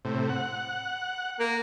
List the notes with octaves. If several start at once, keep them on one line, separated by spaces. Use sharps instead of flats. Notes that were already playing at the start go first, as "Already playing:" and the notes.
A2 C3
F#5
A#3